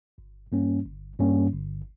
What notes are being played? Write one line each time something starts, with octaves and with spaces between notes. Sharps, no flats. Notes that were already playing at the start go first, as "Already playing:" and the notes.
G1
G2 G3 A#3 C#4
G1
G2 G3 A#3 C#4
G1